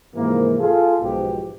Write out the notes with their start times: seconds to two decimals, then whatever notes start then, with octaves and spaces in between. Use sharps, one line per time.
0.15 G#2 C3 E3 F3 A#3
0.59 F4 G#4 A4
1.01 B1 G#2 B2 F3 B3 G4